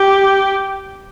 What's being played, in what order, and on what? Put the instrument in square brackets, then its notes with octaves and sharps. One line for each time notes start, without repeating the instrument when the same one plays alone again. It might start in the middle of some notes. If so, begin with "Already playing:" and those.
Already playing: [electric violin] G4